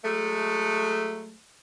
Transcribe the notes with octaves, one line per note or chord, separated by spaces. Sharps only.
F#3 G#3 A3